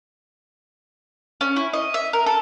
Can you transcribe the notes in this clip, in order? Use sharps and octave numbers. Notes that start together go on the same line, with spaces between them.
C#4
E4
D#5
E5
A#4
A4